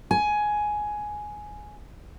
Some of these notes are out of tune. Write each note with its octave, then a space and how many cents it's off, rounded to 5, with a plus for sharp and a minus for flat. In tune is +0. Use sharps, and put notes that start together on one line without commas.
G#5 +10